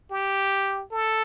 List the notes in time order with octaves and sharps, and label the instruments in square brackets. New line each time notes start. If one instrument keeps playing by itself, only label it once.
[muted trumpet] G4
A4